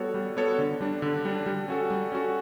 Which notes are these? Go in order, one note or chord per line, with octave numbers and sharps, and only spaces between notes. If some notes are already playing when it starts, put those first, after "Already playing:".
Already playing: G3 B3 F#4 A4 C#5
G3
B3 F#4 A4 C#5
D3
G3 D4
D3
G3 D4
G3
C#4 F#4 A4
G3
C#4 F#4 A4